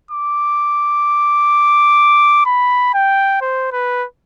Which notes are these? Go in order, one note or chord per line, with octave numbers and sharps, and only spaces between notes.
D6
B5
G5
C5
B4